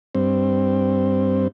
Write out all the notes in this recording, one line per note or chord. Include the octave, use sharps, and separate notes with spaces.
G2 C4